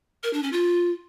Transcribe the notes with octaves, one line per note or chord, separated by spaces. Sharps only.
A#4
D4
C#4
F4